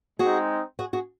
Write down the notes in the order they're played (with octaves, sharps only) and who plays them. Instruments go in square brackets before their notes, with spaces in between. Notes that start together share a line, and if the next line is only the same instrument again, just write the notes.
[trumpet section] G#3 C4 D#4 [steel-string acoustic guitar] F#4 G#4
[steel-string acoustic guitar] F#4 G#4
F#4 G#4